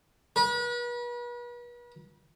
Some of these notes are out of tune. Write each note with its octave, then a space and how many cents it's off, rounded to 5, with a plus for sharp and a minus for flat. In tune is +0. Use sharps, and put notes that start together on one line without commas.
B4 -40